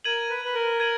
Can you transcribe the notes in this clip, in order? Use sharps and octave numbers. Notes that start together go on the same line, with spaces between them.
A#4 G#6 D#7 F#7
B4
B4
A#4
G#6 D#7 F#7